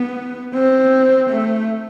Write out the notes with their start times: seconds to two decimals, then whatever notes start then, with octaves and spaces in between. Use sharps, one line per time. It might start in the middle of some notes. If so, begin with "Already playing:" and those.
Already playing: B3
0.54 C4
1.30 A3